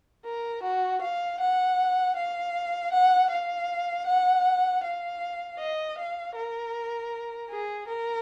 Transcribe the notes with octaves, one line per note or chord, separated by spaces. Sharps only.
A#4
F#4
F5
F#5
F5
F#5
F5
F#5
F5
D#5
F5
A#4
G#4
A#4